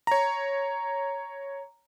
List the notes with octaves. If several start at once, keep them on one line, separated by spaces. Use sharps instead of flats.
C#5 A#5